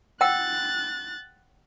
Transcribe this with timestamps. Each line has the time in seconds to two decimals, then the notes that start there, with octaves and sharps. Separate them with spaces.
0.21 F#5 G5 E6 F#6 A6